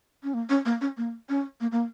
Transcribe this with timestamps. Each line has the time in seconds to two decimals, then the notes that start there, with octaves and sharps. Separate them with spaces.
0.23 C#4
0.34 A#3
0.49 C#4
0.65 A#3
0.81 C#4
0.97 A#3
1.29 C#4
1.61 A#3
1.72 A#3